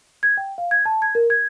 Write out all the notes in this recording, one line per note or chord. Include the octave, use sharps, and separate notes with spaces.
G#6
G5
F5
G#6
A5
G#6
A#4
G#6